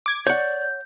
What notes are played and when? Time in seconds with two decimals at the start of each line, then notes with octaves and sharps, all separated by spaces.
0.06 D6 G#6
0.27 C#5 D5 F#5 G6